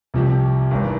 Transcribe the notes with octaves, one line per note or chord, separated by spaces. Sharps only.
C2 C3 F3 C4 G4
G#1 G2 E3